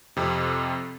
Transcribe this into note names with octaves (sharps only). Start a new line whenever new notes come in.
F2 C3